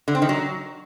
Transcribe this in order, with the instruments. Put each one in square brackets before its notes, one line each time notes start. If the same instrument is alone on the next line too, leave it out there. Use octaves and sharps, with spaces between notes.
[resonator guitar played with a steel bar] D3
C4
D#3
F#3